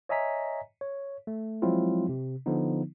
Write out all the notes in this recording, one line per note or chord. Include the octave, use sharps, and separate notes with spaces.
C#5 D#5 E5 G#5 A#5 B6
C#5
A3
F3 F#3 G#3 C4 E4 F4
C3
D3 F3 B3 D#4